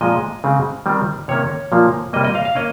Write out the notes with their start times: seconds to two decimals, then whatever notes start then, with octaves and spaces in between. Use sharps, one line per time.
0.01 A#2 F3 G#3 C4 D#5
0.44 C#3 G#3 C4
0.86 D#3 G3 C4
1.28 C3 D#3 A#3 C#4 C#5
1.72 A#2 F3 A#3
2.13 C3 G3 A#3 D#5
2.24 D#5
2.35 F5
2.45 F5
2.56 A#3 C#4 D#5